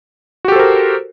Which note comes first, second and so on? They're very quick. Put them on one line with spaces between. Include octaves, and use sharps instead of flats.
F#4 G4 A4 C5 A#4